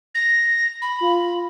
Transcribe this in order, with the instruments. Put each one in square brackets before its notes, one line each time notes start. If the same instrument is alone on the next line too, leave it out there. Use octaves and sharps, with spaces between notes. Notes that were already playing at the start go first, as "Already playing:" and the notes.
[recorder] A#6
B5
[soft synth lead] F4